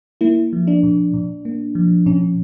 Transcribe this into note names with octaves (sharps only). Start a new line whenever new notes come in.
A#3 E4
F3
D4
A#2
A#2
A#3
F3
A#2 C#4